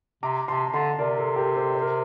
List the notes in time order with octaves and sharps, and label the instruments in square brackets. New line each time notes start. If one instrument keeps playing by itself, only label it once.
[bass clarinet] C3 [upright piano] A#5 D6
[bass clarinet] C3 [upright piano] A5 C6
[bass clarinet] D3 [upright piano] A5 C6
[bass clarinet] C3 [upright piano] A#4 D5
[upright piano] A4
G4 A#4
A4 C5
C5
A#4